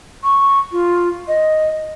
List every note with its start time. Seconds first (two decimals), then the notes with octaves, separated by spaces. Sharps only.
0.23 C#6
0.72 F4
1.28 D#5